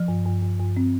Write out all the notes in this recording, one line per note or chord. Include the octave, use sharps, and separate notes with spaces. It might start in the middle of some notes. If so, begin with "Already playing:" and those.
Already playing: F3
G2
G2
G2
G2
C4